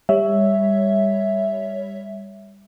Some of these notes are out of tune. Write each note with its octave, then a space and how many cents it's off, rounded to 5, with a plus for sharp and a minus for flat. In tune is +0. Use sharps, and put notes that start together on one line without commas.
G3 +25 C#5 +10 E5 +0